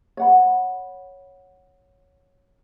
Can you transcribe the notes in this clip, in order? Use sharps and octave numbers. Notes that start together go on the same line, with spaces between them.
C#5 F#5 B5